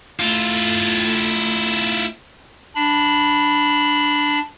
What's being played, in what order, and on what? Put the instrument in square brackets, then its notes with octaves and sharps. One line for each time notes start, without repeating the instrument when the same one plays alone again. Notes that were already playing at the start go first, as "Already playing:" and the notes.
[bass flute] A3 [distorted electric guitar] E4 F4
[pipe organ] D4 B5